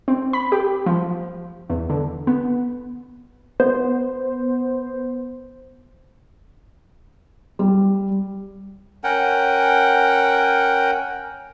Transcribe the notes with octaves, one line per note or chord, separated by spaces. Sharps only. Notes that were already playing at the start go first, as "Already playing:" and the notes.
C4
B5
G4
F3
E2
D3
B3
B3 C5
G3
C#4 A#4 F#5 G5